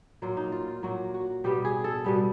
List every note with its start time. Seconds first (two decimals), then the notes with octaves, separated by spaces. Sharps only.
0.22 A#2 F#3 A#3 F4
0.37 D#4
0.52 F4
0.67 F4
0.83 A#2 F#3 A#3 F#4
1.14 F#4
1.44 B2 G3 B3 G4
1.65 G#4
1.84 A4
2.04 B2 G3 B3